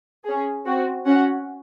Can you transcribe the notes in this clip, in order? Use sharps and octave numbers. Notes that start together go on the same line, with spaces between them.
C#4 G#4
C4 F#4
C#4 F#4 F#5